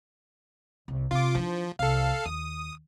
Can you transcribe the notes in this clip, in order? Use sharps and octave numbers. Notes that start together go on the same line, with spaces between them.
C2
C3 F4 D6
E3 F3 D4
C2 A4 F5
D#2 D#6